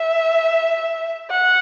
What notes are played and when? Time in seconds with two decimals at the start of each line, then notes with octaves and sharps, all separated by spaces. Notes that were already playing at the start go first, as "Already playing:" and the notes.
Already playing: E5
1.30 F#5